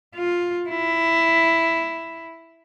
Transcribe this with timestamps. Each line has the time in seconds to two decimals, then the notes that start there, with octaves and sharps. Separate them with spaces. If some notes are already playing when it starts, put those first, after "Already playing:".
0.15 F4
0.69 E4